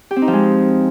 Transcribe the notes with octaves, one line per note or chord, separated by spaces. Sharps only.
G4
C4
D#4
F3
G#3